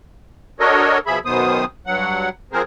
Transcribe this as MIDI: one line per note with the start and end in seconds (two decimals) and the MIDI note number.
0.60 0.98 62
0.60 0.98 66
0.60 0.98 69
0.60 0.98 70
0.60 0.98 73
0.60 0.98 75
1.06 1.19 47
1.06 1.19 53
1.06 1.19 68
1.06 1.19 76
1.06 1.19 83
1.25 1.65 42
1.25 1.65 47
1.25 1.65 51
1.25 1.65 59
1.25 1.65 72
1.25 1.65 87
1.86 2.29 43
1.86 2.29 54
1.86 2.29 78
2.53 2.62 53
2.53 2.62 60
2.53 2.62 68
2.53 2.62 70
2.53 2.62 72